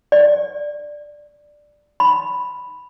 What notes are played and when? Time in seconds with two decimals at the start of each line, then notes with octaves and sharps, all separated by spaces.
0.12 D5
2.00 B5